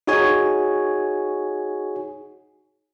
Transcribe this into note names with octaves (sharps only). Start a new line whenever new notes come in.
D#4 F#4 G#4 C#5 G#5